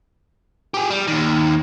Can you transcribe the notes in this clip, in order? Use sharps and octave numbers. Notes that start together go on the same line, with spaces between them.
G4 G#4
G3
D#2 D#3